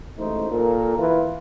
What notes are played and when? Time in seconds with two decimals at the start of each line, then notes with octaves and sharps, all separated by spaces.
0.18 A1 G#2 A3 D#4 C5
0.51 A#2 A#3 A4 A#4
0.99 E3 F4